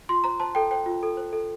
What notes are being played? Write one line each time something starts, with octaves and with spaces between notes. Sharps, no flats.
F4 C6
C5 A#5
C5 A5
A4 G5
C5 G5
F4
A4
C5
A4